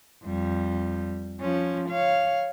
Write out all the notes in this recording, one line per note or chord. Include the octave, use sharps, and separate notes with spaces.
F2 G3
F3 C#4
C#5 F5